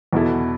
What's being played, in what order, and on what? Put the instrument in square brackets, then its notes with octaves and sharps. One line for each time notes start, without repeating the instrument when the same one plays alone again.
[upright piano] E2 B2 B3 E4 A4